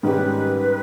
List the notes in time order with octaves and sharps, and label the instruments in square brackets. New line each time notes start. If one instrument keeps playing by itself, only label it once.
[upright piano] G#2 D#3 G3 C#4 G4 [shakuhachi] B4